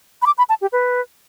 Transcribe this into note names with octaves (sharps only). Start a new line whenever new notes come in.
B5
D6
B5
A5
G4
B4